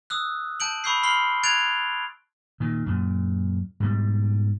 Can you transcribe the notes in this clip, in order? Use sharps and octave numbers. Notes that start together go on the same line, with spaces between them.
D#6 E6 F#6
A5 G6 D7 F#7
B5 C#6 E6 G6 C7
B5 C6 F6 C7 G7
F#6 G#6 A6 D7 F7
A#2 D#3
F#2 A#2
G#2 B2 G3